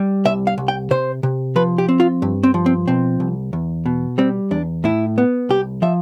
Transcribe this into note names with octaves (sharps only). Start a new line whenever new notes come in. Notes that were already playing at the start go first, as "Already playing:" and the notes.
Already playing: G3
C2 E5
F5
C2
G5
C3 C5
C3
F3 B4
G4
C4
F4
G2
C4
F3
C4
B2 C4
C2
E2
B2
G3 C4
E2 D4
A2 E4
B3
C2 G4
F3 E5